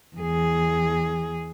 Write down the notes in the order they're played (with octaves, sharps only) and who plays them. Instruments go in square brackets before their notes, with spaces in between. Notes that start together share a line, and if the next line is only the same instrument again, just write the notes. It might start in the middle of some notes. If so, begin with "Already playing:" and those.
[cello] E2 G#4